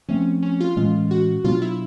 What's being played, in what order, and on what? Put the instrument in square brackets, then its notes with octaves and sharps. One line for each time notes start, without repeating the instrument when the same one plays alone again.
[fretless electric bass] F3 A3 C4 [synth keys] C#4
[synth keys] C#4
F4
[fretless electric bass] A2 E3 G#3 C#4 [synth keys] F4
[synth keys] F#4
[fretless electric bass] B2 F#3 B3 D4 [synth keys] F4
[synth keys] E4